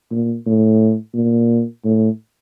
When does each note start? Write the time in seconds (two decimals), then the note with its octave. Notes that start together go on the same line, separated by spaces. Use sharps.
0.11 A#2
0.46 A2
1.15 A#2
1.85 A2